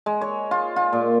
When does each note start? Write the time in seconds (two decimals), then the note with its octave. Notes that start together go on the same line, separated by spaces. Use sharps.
0.06 G#3
0.21 C#5
0.51 F4
0.76 F4
0.93 A#2